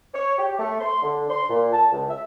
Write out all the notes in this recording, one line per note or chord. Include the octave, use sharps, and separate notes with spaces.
C#5
G4
A3
C6
D3
C6
A#2
A5
C#2
E5